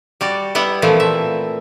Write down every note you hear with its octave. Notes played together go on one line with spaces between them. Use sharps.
G3 F#4 D5
G3 B3 E4 F#5
A#2 E3 F3 A3 C4
E5